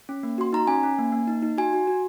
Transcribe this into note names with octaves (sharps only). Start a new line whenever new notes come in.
C#4
A#3
F#4 C6
D#4 A#5
C#4 G#5
C#4
A#3
A#3
D#4
D#4
F#4 G#5
F#4
F#4